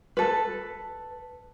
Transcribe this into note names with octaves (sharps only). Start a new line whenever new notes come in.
A4 B4